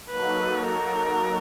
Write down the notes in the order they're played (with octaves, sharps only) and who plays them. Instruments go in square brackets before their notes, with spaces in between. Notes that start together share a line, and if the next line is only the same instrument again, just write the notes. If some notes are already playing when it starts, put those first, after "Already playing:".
[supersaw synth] F#3 A#3 D#4 F#4 A4 [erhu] B4
[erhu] A#4